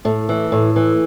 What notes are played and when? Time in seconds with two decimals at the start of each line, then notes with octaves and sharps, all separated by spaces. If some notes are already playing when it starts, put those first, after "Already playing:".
0.05 A2 A3
0.29 E3
0.52 A2
0.76 E3